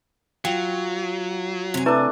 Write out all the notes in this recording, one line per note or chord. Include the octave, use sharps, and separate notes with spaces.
F#3 F4 G5
C3 G#5
A3 D4 E4 B4